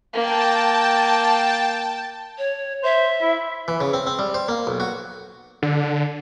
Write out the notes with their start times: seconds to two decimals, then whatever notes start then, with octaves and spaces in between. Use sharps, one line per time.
0.13 A#3 G5 A5
2.38 C#5
2.83 C5 E5
3.22 E4
3.68 E3
3.80 C#3
3.93 C4
4.07 C4
4.19 G3
4.34 C5
4.48 A#3
4.67 B1
4.80 F#4
5.62 D3